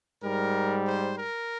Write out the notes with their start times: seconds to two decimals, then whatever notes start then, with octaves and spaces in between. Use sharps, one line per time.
0.23 G#2 G3 A#4
0.87 C5
1.18 A#4